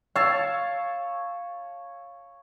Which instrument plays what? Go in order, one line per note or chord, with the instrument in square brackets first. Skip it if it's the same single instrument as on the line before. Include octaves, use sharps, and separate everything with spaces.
[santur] C#5 A5 E6 [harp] F5